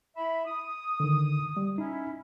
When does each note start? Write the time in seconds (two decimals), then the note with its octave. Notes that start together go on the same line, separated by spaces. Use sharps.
0.17 E4 E5 B5
0.46 D#6
1.00 D3 D#3
1.57 G3
1.78 C#4 D#4 E4